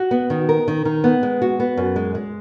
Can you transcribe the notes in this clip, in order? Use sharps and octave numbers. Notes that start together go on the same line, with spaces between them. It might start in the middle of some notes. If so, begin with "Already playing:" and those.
Already playing: F#4
B3
D#3
A#4
D#3
D#3
B3
G#3
F#4
B3
F#2
G#3
G#3